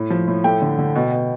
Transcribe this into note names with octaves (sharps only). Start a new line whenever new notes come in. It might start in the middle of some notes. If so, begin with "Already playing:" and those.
Already playing: A2
F3
A2
A3 G5
D3
D3
B2
B2